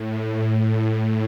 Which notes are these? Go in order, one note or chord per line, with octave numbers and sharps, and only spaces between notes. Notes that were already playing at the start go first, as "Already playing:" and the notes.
Already playing: A2
A2